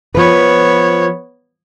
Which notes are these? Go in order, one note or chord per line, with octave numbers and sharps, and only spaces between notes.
F3 B3 B4 C#5